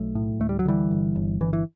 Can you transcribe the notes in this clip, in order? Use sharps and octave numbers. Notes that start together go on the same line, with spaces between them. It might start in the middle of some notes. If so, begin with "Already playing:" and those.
Already playing: B1 F#3 A3
A2
D2 A3
G3
F#3
D3 E3 G3
G1
G1
G1 E3
E3